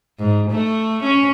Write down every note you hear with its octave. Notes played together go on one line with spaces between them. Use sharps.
G#2
A3
C#4